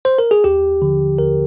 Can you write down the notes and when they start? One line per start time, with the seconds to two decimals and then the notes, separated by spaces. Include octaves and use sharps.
0.05 C5
0.19 A#4
0.31 G#4
0.44 D#2 G4
0.82 D3 F3
1.18 D#2 A#4